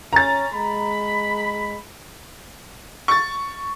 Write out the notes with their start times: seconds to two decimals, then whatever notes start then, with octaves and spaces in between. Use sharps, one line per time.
0.13 C#4 A#5 A6
0.52 G#3 B5
3.08 C#6 A6